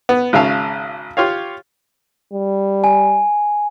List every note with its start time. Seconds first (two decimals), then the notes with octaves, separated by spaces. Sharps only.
0.09 B3
0.33 G#1 C#3 E5 F5 A5
1.17 F4 G4 C#5 F5
2.32 G3
2.84 G#5